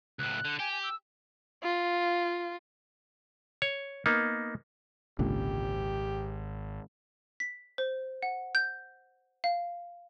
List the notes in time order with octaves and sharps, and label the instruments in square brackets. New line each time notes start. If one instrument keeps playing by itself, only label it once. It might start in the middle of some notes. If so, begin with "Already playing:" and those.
[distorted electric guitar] C#2 A2 [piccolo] F#6
[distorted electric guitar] D3
[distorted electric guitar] G4 [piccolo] G#5
[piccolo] G#5
E6
[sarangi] F4
[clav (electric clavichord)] C#5
A#3 B3 D#4
[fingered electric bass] G#1 [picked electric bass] C#2 A#2 D3 [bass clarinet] G4
[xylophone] B6
C5
F#5
G6
F5